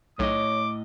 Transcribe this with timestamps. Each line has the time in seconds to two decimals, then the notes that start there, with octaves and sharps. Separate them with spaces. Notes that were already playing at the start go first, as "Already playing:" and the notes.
0.19 B1 A2 C#5 D#5 D6